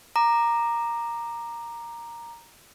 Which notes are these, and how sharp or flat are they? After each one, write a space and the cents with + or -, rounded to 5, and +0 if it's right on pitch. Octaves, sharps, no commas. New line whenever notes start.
A#5 +0 D6 +25